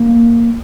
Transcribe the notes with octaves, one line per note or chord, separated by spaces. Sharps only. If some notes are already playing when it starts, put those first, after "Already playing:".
Already playing: A#3